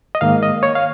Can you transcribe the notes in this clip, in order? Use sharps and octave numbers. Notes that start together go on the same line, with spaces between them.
D#5
G#2 D#3 A#3 F5
D#5
C#5
F5